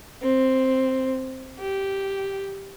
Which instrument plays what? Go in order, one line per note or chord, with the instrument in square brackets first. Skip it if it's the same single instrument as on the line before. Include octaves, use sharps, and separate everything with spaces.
[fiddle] C4
G4